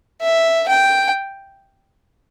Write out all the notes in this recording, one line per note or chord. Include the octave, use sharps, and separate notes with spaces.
E5
G5